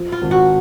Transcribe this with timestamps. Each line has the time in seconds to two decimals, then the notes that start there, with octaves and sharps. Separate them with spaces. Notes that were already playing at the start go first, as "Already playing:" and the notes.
Already playing: F3
0.12 F4
0.22 G#1
0.31 F#4